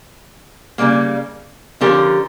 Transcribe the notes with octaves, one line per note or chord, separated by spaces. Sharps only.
C#3 G3 A#3
D3 F3 C#4 G4 A#4